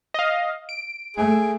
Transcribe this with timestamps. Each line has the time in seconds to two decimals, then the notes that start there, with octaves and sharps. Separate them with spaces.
0.14 D#5 F5
0.69 D7
1.17 A3 G#4